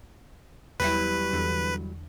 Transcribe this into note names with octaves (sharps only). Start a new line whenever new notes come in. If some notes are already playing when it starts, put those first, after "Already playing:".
E2 F#3 G3 E4 B4
E2 D3 E3